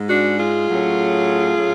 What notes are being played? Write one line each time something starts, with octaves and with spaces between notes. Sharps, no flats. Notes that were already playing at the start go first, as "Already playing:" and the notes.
Already playing: G#2 G#3
D4 F#4
F4 G#4
A2 F#3 A3 C#4
A2 F#3 A3 C#4